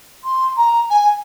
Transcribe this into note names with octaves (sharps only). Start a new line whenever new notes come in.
C6
A#5
G#5
G#5